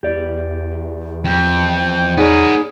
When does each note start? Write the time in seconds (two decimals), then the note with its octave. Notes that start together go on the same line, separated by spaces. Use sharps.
0.03 E2 G4 D5
1.25 F2 G5
2.17 B3 D#4 G#4 A#4 C#5 D5